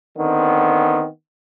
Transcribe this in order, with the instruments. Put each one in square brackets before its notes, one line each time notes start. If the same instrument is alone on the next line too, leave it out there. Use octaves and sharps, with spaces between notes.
[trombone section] D3 D#3 B3 C4